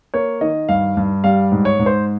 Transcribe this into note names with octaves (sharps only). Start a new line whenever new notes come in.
A#3 C#5
D#3 D#5
G2 F5
G2
G3 F5
G#2
C#5
G#2
C5